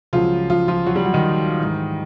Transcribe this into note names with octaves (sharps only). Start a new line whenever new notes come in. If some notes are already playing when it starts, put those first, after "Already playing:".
C#2 C#3 F3 F#3 F4
F3 F4
F3 F4
F#3 F#4
G3 G4
F#3 F#4
D#3 D#4
G#2 E3